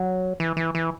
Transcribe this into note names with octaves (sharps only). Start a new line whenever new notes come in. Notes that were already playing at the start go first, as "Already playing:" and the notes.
Already playing: F#3
E3
E3
E3